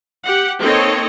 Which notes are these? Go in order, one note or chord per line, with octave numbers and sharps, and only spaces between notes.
G4 F#5
A#3 C4 D#4 A4 C#5 D#5